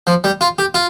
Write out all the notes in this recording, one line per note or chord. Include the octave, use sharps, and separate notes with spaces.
F3
G3
F4
G4
F4